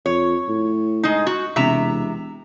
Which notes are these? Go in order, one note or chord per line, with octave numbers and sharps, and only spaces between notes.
F2 C#5
A2
G#3 D#4
F#4
E1 C3 E5 A#5